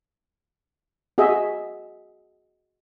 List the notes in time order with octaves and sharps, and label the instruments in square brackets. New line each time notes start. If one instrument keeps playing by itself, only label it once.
[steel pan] F#4 G#4 D#5 E5